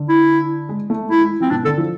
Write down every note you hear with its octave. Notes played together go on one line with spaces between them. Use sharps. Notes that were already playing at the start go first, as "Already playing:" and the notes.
Already playing: D3
E4
G#3
A3
G#3 E4
G#3
F3 C4
B2 D4
D3 A4
F3